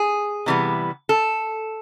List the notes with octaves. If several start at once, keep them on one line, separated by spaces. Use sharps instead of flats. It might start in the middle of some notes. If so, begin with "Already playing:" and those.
Already playing: G#4
C3 E3 G3 B3
A4